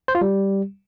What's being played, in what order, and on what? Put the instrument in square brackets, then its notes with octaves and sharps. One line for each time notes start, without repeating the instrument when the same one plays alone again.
[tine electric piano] C5
F4
G3